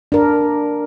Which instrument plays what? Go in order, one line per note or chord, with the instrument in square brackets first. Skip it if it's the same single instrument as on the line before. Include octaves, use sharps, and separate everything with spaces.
[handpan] D4 A#4